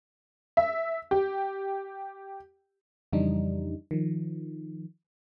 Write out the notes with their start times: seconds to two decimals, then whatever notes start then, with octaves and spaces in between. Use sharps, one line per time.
0.57 E5
1.11 G4
3.13 F2 C#3 E3 G3 D4 D#4
3.91 D#3 F3